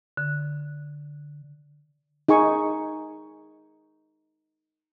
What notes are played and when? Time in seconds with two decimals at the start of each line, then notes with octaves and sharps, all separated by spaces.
0.17 D3
2.28 D#4 G#4 G#5 C#6